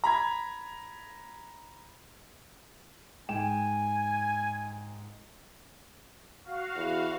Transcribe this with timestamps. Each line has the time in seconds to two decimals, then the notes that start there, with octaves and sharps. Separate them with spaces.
0.04 A#5 B5 G#6
3.29 G#2 G5 G#5 E7
6.44 F#4 F5
6.76 E2